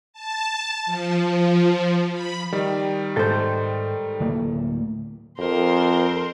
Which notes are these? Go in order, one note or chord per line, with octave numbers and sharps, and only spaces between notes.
A5
F3
F3
B5
D#3 G3
G#2 A4 C5
D1 A2 A#3
F2 A#4 C5